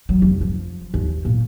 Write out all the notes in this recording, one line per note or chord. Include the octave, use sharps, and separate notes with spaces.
F#3
F1
F3
D#2
A#2